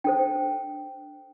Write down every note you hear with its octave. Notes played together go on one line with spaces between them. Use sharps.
D4 A4 C5 G5